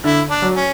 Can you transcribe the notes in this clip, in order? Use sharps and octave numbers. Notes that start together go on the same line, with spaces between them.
D3 E4
D4
F#3
C#4